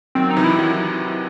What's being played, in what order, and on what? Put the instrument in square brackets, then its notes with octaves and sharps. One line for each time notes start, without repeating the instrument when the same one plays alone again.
[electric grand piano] D#3 F#3 [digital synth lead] C4
[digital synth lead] D#4
[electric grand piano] C3 E3
[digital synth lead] E4
[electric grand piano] D#3 F#3 [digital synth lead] E4